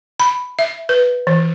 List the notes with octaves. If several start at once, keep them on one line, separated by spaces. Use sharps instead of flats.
B5
E5
B4
E3